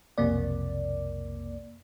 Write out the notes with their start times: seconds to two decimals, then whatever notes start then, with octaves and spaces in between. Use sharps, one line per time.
0.18 B1 F2 C3 A#3 D5